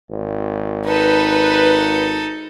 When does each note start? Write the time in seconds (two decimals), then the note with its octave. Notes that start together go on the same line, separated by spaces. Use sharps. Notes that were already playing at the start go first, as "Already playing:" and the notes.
0.10 G#1
0.86 D#4 A4 B4